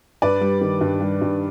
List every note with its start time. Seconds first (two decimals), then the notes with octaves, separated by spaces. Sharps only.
0.22 G2 B4 D5
0.41 G3
0.61 D#3
0.81 G2
1.01 G3
1.21 G2